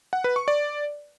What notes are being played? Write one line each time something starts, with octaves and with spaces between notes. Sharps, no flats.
F#5
B4
C#6
D5